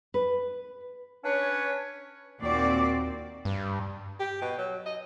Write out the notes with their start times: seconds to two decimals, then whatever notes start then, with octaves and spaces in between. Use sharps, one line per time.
0.14 B4
1.24 C#4 D4 B4 C#5
2.40 D#2 A#2 C4 F#4 D5
3.45 G2
4.19 G4
4.42 B2
4.58 F#3
4.86 D#5